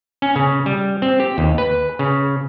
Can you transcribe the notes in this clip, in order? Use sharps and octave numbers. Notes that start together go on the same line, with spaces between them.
C#4
C#3
G3
C4
G4
D#2
B4
C#3